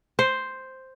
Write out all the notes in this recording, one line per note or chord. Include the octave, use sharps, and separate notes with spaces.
C5